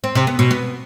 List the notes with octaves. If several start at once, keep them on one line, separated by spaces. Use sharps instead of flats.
C4
C3
B3
B2
B3